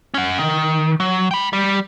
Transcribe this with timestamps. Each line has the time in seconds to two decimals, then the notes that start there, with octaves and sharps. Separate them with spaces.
0.14 C#4 F#5
0.38 D#3
1.00 F#3
1.31 G5 B5
1.53 G3